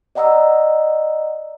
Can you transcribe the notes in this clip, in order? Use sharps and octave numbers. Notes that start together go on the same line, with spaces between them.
D5 D#5 F#5 A#5 D#6 E6